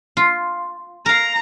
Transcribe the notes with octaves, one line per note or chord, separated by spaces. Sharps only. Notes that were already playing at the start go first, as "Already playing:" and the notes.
F4
A#4 F5 A#5